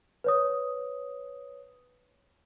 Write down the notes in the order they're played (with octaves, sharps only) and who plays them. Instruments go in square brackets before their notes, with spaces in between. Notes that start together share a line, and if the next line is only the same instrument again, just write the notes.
[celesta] B4 C#5 D#6